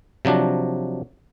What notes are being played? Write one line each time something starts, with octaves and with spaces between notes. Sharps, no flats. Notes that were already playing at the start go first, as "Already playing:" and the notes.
C3 F3 F#3 D4